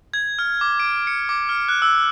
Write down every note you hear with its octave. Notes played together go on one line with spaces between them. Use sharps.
G#6
F6
D6
D7
C#7
D6
F6
F#6
E6